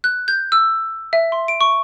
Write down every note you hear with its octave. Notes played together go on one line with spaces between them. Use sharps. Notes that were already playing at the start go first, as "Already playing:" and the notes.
F#6
G6
E6
E5
C6
D7
C#6